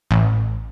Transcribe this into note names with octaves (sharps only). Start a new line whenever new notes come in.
A1